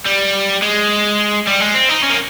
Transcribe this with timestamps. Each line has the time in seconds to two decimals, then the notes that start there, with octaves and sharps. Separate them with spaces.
0.06 G3
0.62 G#3
1.47 G3
1.60 G#3
1.75 C4
1.89 D#4
2.03 C#4
2.10 A#3